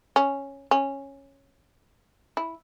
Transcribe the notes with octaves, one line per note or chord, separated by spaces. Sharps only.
C#4
C#4
E4